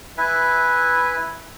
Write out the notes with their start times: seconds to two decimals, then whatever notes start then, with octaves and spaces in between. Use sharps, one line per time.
0.18 E4 B4 E5 G#5